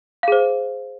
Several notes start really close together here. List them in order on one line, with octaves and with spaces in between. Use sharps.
F5 G#4 C5